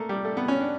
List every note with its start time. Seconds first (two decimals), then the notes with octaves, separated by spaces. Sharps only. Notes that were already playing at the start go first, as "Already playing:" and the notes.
Already playing: A3 A#3
0.09 G3
0.25 A3
0.37 B3
0.48 C#4
0.60 D4